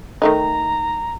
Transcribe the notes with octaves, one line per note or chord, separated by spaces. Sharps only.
D#3 A3 D#4 A#5